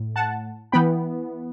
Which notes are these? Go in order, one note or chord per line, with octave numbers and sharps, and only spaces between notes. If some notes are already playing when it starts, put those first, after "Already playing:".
Already playing: A2
F#5 A5
E3 B3 G5 B5